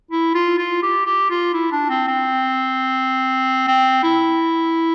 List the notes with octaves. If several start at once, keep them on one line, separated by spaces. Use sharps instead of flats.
E4
F4
F4
G4
G4
F4
E4
D4
C4
C4
C4
E4